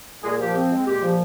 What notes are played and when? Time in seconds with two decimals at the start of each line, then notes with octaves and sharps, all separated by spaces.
0.23 A#2 G#3 G#4
0.39 F3 G4
0.54 C4
0.70 G#3
0.86 A#2 G4
1.01 F3